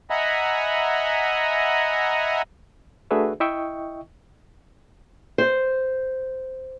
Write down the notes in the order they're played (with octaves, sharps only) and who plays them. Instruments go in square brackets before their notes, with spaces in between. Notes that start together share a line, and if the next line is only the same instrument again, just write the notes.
[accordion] D#5 E5 F#5 G#5 A#5 B5
[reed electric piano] A3 D4 F#4 G#4 B4 E5
E4 D#5 E5 G5 C#6
[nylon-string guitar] C5